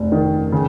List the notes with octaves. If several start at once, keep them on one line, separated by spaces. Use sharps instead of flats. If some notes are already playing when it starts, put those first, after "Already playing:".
Already playing: F1
D#3
C#3